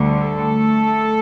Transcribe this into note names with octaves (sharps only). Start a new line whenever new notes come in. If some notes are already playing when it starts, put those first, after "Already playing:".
Already playing: D2 D3 G3
A3 A4